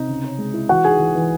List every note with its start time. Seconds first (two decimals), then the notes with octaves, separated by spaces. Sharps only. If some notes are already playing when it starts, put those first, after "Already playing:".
Already playing: C3 D#4
0.08 C#3
0.24 C#4
0.38 G#3
0.54 E4
0.69 E3 F#4 F#5
0.84 D#4 G#4 G#5
1.00 E3
1.15 E3